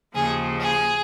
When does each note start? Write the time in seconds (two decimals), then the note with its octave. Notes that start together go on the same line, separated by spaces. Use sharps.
0.15 D#2 C#3 F3 G#4
0.59 G#4